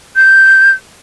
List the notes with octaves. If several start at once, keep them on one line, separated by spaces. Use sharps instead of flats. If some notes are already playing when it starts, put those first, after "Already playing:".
G6